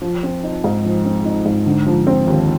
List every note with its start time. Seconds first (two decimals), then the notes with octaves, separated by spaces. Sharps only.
0.02 F3
0.23 C4
0.43 D#4
0.64 G#2
0.85 F3
1.05 C4
1.25 D#4
1.46 G#2
1.66 D3
1.87 F3
2.07 C4
2.27 D#2